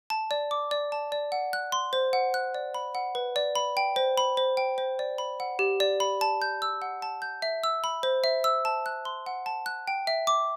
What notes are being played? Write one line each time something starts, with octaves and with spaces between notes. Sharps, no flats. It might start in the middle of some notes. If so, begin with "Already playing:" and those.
A5
D5
D6
D5
A5
D5
F#5
F#6
C6
C5
F#5
F#6
D5
B5
F#5
B4
D5
B5
G5
C5
B5
C5
G5
C5
D5
B5
F#5
G4
D5
B5
A5
G6
E6
F#5
A5
G6
E5
E6
B5
C5
E5
E6
A5
F#6
C6
F#5
A5
F#6
G5
E5
D6